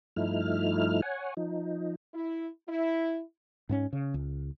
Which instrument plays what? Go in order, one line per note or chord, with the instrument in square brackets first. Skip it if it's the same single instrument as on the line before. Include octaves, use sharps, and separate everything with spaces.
[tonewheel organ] G2 F3 A3 D#4 E4 F6
C#5 F#5 G#5
F3 D#4
[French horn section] E4
E4
[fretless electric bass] G#2 B3 C#4
C#3
C#2